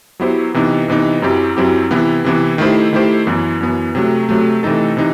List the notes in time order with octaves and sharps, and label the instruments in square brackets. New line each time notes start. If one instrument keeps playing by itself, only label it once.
[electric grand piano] F#3 B3 E4 G4 C5
C3 E3 B3 D#4
C3 E3 B3 D#4
F#2 F#3 C4 E4 G4
F#2 F#3 C4 E4 G4
C3 E3 B3 E4
C3 E3 B3 E4
D#3 A3 E4 G4 C5
D#3 A3 E4 G4 C5
F#2 E3 B3
F#2 E3 B3
C3 F#3 A3
C3 F#3 A3
C3 E3 A3 D#4 A4
C3 E3 D#4